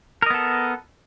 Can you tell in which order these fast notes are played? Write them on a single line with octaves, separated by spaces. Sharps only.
A#4 D#5 B3 A4